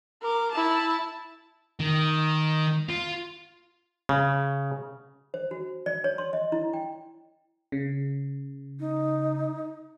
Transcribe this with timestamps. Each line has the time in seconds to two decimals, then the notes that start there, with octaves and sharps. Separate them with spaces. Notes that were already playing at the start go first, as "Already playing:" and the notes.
0.22 A#4 D6
0.52 E4 A5
1.80 D#3
2.89 F4
4.09 C#3
5.34 C5
5.51 F#4
5.86 D5
6.04 C#5
6.18 C6
6.33 D#5
6.52 E4
6.74 G5
7.72 C#3
8.80 D#4